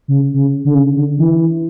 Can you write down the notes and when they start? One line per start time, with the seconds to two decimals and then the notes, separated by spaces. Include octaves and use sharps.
0.08 C#3
0.34 C#3
0.65 D3
0.75 C#3
0.97 D3
1.19 E3